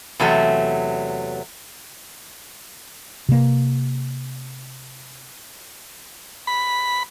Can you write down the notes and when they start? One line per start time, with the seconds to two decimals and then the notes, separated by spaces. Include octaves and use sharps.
0.20 E2 C3 F#3 A3
3.29 C3 A#3
6.47 B5